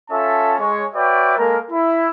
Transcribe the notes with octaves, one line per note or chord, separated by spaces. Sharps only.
C#4 F4 A4 E5 A5
G#3 C#5
F#4 B4 C#5 D5 E5 G5
G#3 A#3 A4 A#4
E4